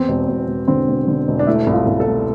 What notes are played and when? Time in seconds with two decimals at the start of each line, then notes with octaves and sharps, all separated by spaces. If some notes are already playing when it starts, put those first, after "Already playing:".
Already playing: E2 C4
0.08 E1
0.28 E1
0.47 E1
0.68 D3 C4
0.88 E1
1.08 D3
1.28 E1
1.39 D4
1.47 A3 E4
1.67 C2
1.73 F4
1.87 C2
2.00 A4
2.06 A3